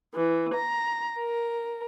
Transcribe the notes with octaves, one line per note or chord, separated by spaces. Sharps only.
E3
A#5
A#4